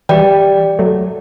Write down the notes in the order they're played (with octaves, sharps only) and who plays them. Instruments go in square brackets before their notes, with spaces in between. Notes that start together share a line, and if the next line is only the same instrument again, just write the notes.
[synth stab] E3 G3 [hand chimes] G4 D5 G5
[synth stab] F#3 A3